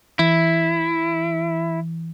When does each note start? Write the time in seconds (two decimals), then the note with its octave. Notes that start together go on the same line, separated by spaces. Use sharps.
0.19 E3 E4